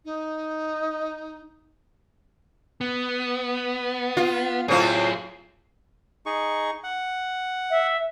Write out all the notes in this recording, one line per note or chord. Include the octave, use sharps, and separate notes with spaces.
D#4
B3
F4
A2 F#3 C4 F4 G#4
D#4 G#4 C#6
F#5
E5